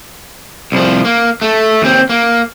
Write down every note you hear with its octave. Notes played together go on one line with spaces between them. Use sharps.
C2 F3
A#3
A3
D#2 C4
A#3